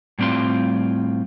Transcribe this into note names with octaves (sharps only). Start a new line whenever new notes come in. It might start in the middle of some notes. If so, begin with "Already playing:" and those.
A2 G3 C4 F4 C6